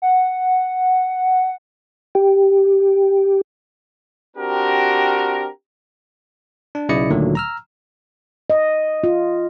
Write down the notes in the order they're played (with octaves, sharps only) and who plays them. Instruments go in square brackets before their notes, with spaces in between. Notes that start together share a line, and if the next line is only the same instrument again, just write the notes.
[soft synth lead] F#5
[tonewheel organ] G4
[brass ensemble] C4 D4 F#4 G4 A#4
[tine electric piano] D4
B1 C#3 E4 D5 D#5 C#7
D2 A#2 D3 D#3 F#3 A3
A#5 E6 F6
[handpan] D#5
F4